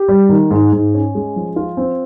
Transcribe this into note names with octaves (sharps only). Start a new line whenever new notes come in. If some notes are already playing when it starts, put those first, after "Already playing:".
Already playing: G4
G3
D#3
G#2
G#2
C#4
G#3
F3
F4
C4